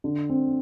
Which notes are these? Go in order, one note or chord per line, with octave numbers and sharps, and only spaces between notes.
D3
C4